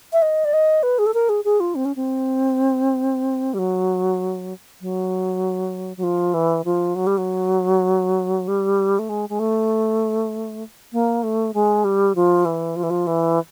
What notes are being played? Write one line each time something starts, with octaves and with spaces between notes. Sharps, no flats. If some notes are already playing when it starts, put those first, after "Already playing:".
E5
D#5
D5
D#5
B4
G#4
A4
A#4
G#4
G#4
F4
C4
C#4
C4
G3
F#3
F#3
F#3
F3
E3
F3
F#3
G3
F#3
G3
A3
G#3
G#3
A3
A#3
A3
G#3
G3
F3
E3
F3
E3
F3
E3